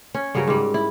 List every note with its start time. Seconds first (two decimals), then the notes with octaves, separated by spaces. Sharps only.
0.15 C#4
0.35 G2 C#3 F#3 A#4
0.47 G#2 G3
0.74 E4